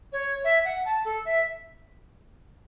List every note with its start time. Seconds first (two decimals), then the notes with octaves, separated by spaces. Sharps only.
0.12 C#5
0.44 E5
0.65 F#5
0.85 A5
1.05 A4
1.25 E5